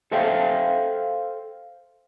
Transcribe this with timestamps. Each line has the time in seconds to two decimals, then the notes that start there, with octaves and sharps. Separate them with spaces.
0.12 A4 C5 E5 F5 G5